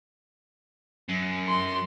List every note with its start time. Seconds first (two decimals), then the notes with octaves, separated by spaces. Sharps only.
1.09 F#2
1.48 C6